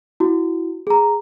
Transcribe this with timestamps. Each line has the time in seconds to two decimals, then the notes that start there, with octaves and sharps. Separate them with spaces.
0.20 E4 F#4
0.87 G#4 A#5